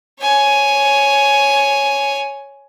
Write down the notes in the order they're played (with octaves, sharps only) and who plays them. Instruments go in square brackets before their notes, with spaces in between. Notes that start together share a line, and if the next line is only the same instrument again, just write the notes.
[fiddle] C#5 G#5